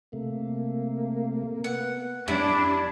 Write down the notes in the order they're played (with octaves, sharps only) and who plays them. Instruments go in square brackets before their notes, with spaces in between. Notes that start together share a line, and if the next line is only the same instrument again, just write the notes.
[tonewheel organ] C3 A3 [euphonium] A#3
[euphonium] B3 [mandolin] F#5
[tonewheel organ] F2 G#5 [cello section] D4 [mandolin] E4 [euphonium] G4